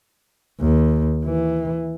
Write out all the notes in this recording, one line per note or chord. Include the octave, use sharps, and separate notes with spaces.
D#2
E3